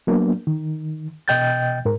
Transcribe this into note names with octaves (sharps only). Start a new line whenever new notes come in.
F#3 A#3 B3 D4
D#3
B2 D#5 G5 G6 A6
G#2 A#4